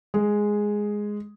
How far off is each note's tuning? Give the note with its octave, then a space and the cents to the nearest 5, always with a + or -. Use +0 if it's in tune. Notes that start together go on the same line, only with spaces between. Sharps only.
G#3 +0 G#4 +0